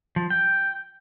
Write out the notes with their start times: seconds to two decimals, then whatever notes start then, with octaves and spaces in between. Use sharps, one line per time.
0.16 F3
0.30 G5